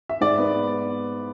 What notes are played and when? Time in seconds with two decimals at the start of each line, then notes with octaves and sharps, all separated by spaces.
0.09 E5
0.21 G#2 D5
0.38 B3